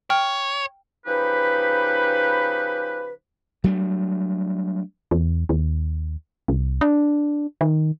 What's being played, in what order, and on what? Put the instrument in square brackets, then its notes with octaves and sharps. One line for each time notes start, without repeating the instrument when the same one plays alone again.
[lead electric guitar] C#5 [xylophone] G5 F6
[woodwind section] C#3 F3 D#4 G4 B4
[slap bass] F#3 G3 A3 D4
[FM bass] E2
D#2
C2
D4
D#3